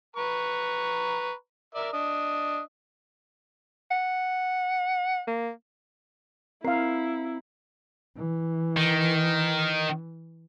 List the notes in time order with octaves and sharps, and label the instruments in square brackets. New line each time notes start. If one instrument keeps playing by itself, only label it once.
[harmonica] B4 A#5 C#6
A#4 D5 E5
D4 D#5
[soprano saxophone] F#5
A#3
[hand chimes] C4 A#5 C7 [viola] E4 [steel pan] A#4 F5
[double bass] E3
[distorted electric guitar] D#3